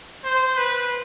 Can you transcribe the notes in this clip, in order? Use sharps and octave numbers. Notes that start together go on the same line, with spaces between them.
C5
B4